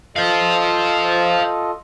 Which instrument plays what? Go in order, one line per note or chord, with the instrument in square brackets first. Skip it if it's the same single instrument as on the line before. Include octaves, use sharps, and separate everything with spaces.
[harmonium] F4 A4 D#5 [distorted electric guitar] C5 F5